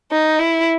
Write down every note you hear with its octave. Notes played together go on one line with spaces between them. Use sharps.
D#4
E4